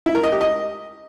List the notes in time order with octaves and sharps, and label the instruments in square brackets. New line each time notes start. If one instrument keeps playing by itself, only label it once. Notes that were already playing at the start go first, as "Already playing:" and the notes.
[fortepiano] E4
A#4
D#5
G4
D#5